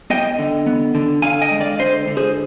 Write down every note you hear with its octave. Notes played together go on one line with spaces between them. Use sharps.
B3 D#5 G5
D3
B3
D3
D3 F5 G#5
D#5 G5
G#3
D5 F5
D3 C5 D#5
D3
G#4 C5